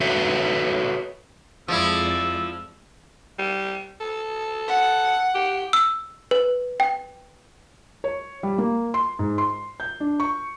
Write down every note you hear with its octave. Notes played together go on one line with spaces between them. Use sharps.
F#4 A4 B4 C#5 E5
F2 F3 G#3 E4 D5 E6
G3
A4
F#5
G4
E6
B4
G5
C#5
G3
A#3
C6
G#2
C6
G6
D4
C#6